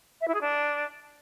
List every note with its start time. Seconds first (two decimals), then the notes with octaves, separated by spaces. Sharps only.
0.21 E5
0.27 E4
0.34 G#4
0.41 D4